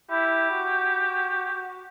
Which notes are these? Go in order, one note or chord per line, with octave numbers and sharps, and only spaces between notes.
E4 G4
F#4